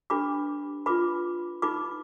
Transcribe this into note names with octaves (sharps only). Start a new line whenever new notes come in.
D4 G4 B4 B5 D6
F4 B4 B5 D6
D#4 G4 B4 B5 D6